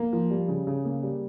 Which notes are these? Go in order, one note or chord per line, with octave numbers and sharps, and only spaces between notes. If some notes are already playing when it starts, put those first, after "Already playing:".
Already playing: A#3
F3
G3
C#3
C#3
A#3
G3